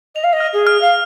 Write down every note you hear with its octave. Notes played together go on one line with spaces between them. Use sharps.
D#5 F7
F5
D#5
F6
G#4
F6
F5